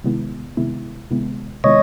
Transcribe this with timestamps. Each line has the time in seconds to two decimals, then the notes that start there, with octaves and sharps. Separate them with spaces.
0.04 C3 D#3 G#3 B3 E4
0.57 C3 D#3 G#3 B3 E4
1.11 C3 D#3 G#3 B3 E4
1.64 C3 D#3 G#3 B3 E4 C#5 D#5